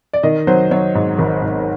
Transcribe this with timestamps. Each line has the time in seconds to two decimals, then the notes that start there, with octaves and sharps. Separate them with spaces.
0.14 D5
0.23 D#3 D#5
0.47 F#3 C5
0.71 F#3 C#5
0.95 G#2
1.19 G#1
1.42 G#2